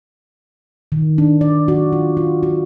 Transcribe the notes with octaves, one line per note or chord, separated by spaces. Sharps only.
D#3
D4
D5
F#4
F4
F4
F#4